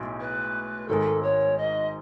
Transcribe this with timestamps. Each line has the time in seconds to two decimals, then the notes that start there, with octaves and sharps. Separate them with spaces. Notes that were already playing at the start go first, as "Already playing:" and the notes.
Already playing: B1 A2 G#3
0.21 B4
0.88 G#1 G#2 D#3 G#3 A4
1.23 C#5
1.58 D#5